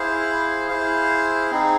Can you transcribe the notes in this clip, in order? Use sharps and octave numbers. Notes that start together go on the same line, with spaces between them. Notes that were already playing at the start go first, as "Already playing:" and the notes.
Already playing: E4 G#4 C5 F5
E4 G#4 C5 F5
C4 D#4 G#4